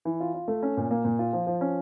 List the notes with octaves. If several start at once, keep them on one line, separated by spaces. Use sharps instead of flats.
E3
F4
F4
A3
C#4
A#2
A#3
A#2
F4
F3
F3
C#4